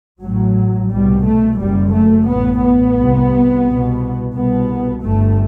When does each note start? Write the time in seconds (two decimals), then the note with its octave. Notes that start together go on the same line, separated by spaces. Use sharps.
0.21 A1 A2 F#3
0.90 C2 B2 G3
1.25 A3
1.59 F#1 F#2 G3
1.93 A3
2.28 A1 A2 B3
2.62 B3
2.96 C2 C3
3.65 C2 B2
4.34 C2 B2 B3
5.03 G1 G2 A3